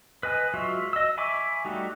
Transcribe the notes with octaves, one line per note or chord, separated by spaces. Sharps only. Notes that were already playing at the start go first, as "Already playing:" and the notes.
B4 D#5 G#5 B5
F#3 G#3 F4 F#4 E5
D#5 E6
E5 G#5 B5 C#6 D6
G3 A3 D#4 F#4 G4